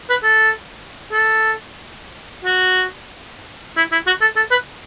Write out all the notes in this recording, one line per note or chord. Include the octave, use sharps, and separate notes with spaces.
B4
A4
A4
F#4
E4
E4
F#4
A4
A4
B4